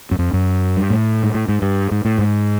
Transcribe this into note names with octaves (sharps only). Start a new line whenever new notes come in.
F#2
F2
F#2
G2
A2
G#2
A2
G#2
G2
G#2
A2
G#2